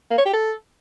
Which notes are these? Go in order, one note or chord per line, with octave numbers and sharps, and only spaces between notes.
A#3
C#5
G4
A4